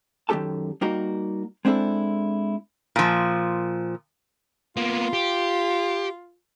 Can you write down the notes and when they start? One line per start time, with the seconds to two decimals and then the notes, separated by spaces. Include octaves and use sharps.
0.29 F#2 D#3 G#3 G4 A4 A5
0.81 G3 A#3 D#4 F#4 A#4
1.65 G#3 C4 D4 E4 A4
2.96 A#2 F3
4.77 A#3 B3 F4
5.13 G4